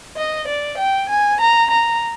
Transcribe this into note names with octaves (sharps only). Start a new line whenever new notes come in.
D#5
D5
G5
G#5
A#5
A#5